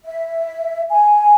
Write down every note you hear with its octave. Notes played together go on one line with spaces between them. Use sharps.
E5
G#5